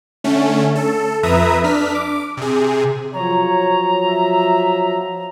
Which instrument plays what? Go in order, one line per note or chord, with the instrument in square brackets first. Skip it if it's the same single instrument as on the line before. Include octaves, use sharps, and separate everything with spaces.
[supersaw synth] D3 A3 C#4
A4
F2 B4 E5 A#5 D#6
D4 F6 B6
D6
C3 G#4
[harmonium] F3 F#3 [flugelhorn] C#5 [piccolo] A#5
[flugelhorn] E5